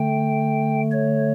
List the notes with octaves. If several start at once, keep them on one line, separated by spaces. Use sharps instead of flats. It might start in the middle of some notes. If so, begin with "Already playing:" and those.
Already playing: D3 A3 G5
C#5